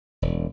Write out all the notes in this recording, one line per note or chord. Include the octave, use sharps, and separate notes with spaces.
E1